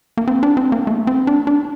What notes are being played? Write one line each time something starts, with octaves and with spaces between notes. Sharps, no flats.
A#3
C4
D4
C4
A#3
A3
C4
D4
D4